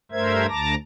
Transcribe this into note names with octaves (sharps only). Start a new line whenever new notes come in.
G2 A3 A#4 C5 E5 G#6
D2 A5 A#5 D6 A#6